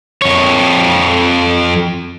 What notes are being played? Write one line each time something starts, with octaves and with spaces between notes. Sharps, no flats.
F2 C#5